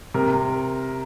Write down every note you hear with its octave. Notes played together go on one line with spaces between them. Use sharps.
C3 A#4